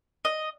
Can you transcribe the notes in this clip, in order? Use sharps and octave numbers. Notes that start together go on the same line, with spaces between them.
D#5